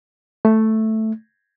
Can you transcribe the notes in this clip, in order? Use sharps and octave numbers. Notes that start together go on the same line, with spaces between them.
A3